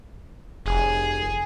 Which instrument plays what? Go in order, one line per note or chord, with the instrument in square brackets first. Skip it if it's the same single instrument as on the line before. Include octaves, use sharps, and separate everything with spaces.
[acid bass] F1 [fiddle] G#4